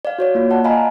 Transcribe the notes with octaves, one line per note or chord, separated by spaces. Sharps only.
D5 F5
F#4 C#5 D5
A#3 F4
D5 F#5 A5
D#5 F5 G#5 A#5 B5